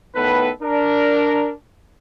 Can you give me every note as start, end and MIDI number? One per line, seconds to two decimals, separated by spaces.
0.15 0.50 45
0.15 0.50 51
0.15 0.50 59
0.15 0.50 69
0.15 0.50 71
0.62 1.52 62
0.62 1.52 70